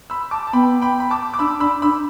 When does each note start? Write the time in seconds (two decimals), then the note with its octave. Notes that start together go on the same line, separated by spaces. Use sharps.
0.10 B5 E6
0.31 A5 D6
0.47 A5
0.53 B3 G5 B5
0.81 G5 B5
1.00 B5
1.10 A5 D6
1.34 D6
1.39 D4 B5 E6
1.60 D4 B5 E6
1.82 D4 B5 E6